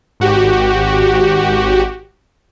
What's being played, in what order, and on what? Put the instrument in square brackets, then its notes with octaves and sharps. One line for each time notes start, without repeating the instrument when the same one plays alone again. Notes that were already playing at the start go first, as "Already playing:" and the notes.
[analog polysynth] G#1 F#4 G4